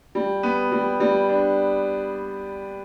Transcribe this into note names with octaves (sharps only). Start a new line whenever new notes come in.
G3
B3
G3
G3
D4